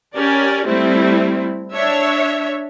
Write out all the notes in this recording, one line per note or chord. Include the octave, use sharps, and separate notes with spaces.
C#4 G4 A#4 D5
G3 A3 C4 E4
D4 C#5 E5